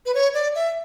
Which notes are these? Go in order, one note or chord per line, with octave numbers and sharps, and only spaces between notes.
B4
C#5
D5
E5